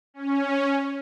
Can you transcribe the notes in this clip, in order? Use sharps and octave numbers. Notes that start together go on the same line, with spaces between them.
C#4